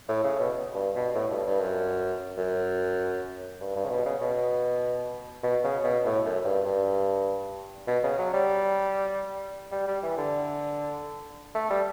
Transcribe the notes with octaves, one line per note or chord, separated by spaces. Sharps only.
A2
C#3
B2
G2
B2
A2
G2
G2
F#2
F#2
G2
G2
C#3
B2
C#3
B2
B2
C#3
B2
A2
F#2
G2
G2
B2
C#3
F#3
G3
G3
G3
E3
D3
A3
G3